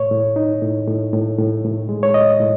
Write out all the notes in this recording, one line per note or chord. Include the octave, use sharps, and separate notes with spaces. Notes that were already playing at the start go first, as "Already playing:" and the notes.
Already playing: A2 C#5
A2
D#4
A2
A2
A2
A2
A2
G#3
C#5
A2 D#5
A2